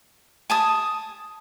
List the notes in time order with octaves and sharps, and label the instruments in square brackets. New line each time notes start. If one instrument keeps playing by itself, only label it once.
[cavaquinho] G#5 A5 D#6